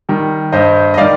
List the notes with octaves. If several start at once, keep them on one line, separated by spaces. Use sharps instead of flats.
D#3 G3
G2 C5 D#5
D#5
D#3 G3 D5 F5